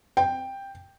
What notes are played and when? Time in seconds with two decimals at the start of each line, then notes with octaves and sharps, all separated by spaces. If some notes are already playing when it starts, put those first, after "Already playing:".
0.17 G5